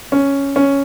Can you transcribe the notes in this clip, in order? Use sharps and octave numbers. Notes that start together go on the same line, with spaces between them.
C#4
C#4